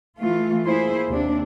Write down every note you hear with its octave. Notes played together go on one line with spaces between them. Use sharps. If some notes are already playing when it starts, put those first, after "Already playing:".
E3 A3 F4
A#3 E4 G#4 C5
D#2 C3 D4